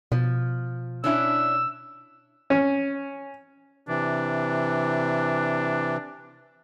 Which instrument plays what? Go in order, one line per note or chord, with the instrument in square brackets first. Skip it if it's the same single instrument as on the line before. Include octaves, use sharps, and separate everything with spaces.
[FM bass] B2 [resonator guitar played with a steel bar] F3
[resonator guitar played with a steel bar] C#4 D4 E4 [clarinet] E6
[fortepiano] C#4
[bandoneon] C3 E3 [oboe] D4